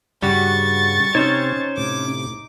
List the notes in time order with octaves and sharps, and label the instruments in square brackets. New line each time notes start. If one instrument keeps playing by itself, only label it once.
[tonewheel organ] G2 C#3 [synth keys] G3 F#4 [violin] C#6 A6
[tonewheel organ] C3 C4 [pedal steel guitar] C#4 C5 C#5 [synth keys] D#4
[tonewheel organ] A2 C3 [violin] D6